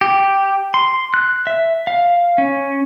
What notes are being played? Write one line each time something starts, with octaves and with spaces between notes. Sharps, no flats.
G4
C6
F#6
E5
F5
C#4